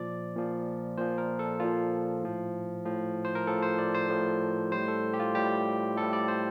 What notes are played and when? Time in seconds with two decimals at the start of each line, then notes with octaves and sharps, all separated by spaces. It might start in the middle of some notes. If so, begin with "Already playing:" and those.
Already playing: A#2 F3 D5
0.36 A#2 F3
0.98 A#2 F3 C5
1.18 A#4
1.39 A4
1.60 A#2 F3 F4
2.22 A2 F3
2.85 A2 F3
3.25 C5
3.35 A#4
3.47 A2 F3 A4
3.63 C5
3.78 D5
3.95 C5
4.09 A2 F3
4.71 A2 G3 C5
4.88 A4
5.14 G4
5.19 F4
5.35 A2 G3 G4
5.97 A2 G3 A4
6.13 D5
6.28 C5